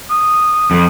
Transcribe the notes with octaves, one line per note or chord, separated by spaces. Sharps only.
D#6
F2